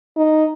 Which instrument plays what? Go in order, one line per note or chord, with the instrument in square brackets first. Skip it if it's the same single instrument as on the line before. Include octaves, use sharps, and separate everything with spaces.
[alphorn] D#4